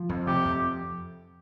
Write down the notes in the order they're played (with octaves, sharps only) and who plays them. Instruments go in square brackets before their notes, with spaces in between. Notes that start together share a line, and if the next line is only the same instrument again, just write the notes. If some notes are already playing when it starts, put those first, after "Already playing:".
Already playing: [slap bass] F3
F2
[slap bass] C3 [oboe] G4
[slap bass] F2